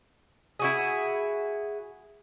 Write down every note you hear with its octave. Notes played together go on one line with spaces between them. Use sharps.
E4 F#4 G#4